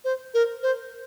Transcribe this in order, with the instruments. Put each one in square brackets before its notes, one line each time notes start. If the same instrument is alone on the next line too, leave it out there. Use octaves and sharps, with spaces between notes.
[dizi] C5
A#4
C5